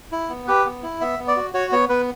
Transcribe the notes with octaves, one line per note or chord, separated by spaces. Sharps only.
E4
B3
G4 B4
B3
E4
B3 E5
B3
D5
F#4
F#4 C#5
B3 C#5
B3 B4